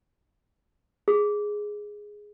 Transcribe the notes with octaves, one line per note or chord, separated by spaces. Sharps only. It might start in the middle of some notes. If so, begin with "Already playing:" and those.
G#4